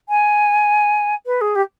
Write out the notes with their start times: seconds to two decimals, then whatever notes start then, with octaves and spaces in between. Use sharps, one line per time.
0.09 G#5
1.26 B4
1.41 G#4
1.55 G4